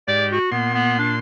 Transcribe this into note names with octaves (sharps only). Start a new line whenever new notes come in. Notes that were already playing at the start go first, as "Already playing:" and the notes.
G#2 G4 D5
F#4
A#2 B3 C6
B3
D4